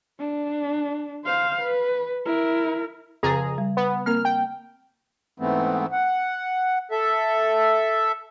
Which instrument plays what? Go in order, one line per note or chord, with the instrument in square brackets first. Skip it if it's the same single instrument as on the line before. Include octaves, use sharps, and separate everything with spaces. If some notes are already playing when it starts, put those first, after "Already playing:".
[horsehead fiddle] D4
C5 F5
B4
E4 A#4
[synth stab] F2 G#4 A#5 [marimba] C#3 A6
[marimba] G3
[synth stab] B3
[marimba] A#3 C4 A#4 [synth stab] F6
[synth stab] G5
[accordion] G#2 E3 A3 B3 C4
F#5
A4 E5